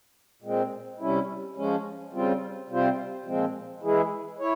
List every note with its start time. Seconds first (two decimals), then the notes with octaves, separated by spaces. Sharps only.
0.42 A#2 G#3 C4
1.00 C3 G3 C#4 E4
1.55 F3 G#3 C#4
2.13 C#3 G3 C4 F4
2.70 C3 G3 C4 F4 C5
3.25 A#2 F3 G#3 C4
3.82 E3 G#3 E4 G#4
4.39 E4 C#5